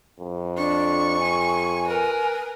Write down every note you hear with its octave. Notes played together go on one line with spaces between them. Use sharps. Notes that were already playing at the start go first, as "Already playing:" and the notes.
F2
D4 C#6
G#5
A#4 B4